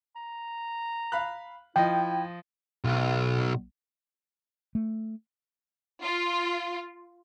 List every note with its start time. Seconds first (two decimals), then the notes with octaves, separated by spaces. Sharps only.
0.16 A#5
1.12 F5 B5 F#6
1.76 F3 E4 D#5 G5
2.84 B1
4.75 A3
6.02 F4